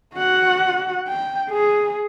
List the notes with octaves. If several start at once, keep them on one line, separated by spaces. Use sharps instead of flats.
F#4 F#5
G5
G#4